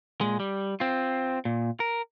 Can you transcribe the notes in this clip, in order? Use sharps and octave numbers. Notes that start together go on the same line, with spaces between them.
A#2 G#3
G3
C4 F4
A#2
A#4